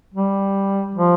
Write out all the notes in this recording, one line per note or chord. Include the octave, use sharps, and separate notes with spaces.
G3
F3